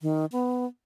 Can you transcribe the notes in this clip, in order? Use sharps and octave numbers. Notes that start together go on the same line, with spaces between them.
D#3
B3